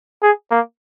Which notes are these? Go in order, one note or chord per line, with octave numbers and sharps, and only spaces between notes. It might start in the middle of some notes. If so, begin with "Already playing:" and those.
G#4
A#3